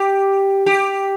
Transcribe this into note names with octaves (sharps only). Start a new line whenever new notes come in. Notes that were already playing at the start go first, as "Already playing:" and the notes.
Already playing: G4
G4